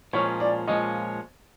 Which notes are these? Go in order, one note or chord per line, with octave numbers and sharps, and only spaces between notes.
A#2 F3 G#3 C#4 C#5
D5
A#2 F3 G#3 C#4 D#5